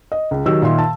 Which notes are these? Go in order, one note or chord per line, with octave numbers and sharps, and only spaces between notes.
D#5
C#2
D#3 F#3 G4 E6
A#2 D#3 E5 C6
A5